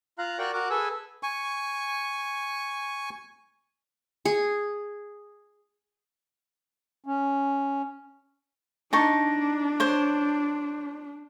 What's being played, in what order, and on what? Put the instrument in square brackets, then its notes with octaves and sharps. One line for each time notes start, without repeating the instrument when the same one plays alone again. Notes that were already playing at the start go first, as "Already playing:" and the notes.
[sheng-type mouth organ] F4 F5 A#5 F#6
F#4 A#4 D5 G5 C#6 F#6
F#4 A#4 F#5 D6
G#4 A4 B4 G#5 E6
[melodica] G#5 C#6
[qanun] G#4
[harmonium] C#4
[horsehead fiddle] D4 [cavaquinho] D#4 A5 C#6
[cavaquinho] C5 C#5